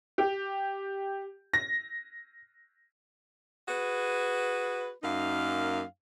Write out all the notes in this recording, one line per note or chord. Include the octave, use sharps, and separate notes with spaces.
G4
A#6
F#4 G#4 B4
F#2 A#3 D#4 F5